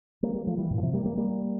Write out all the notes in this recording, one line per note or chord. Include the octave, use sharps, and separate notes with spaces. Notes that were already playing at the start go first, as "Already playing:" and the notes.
G3 A#3
G3 A#3
F3 A3
E3 G3
G2 A#2
F3
C3 E3
G3 A#3
G3 A#3
G3 A#3